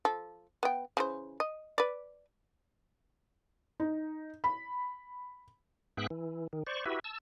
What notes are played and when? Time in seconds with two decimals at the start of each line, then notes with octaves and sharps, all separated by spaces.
0.05 F3 A4
0.63 B3 G5
0.97 C#3 E3 C5
1.40 D#5
1.78 B4 D5
3.80 D#4
4.44 B5
5.97 G#2 B3 G#4 E5 G5 F#6
6.10 E3
6.53 D#3
6.67 C5 D5 C#6
6.85 E4 F#4 G4 B4 E5
7.04 A5 E6